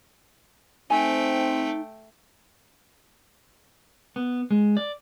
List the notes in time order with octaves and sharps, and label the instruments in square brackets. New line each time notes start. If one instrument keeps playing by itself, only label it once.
[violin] A3 G5 [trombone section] C4 [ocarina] D#4 [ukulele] G#5
[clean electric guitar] B3
G#3
D5